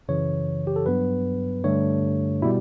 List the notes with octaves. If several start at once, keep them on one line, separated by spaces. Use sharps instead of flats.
F#2 C#3 E3 C#5
G4
A4
G2 F#3 B3 B4
G2 D3 A3 C#5
B2 G3 E4